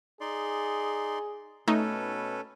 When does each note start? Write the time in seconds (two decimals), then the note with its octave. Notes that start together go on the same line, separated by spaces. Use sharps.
0.21 D#4 G#4 D5 C6
1.68 B2 A3 C#4 D#4 A4 B4